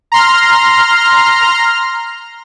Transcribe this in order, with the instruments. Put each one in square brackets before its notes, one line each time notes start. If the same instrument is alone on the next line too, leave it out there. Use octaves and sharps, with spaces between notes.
[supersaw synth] A#5 C6 F6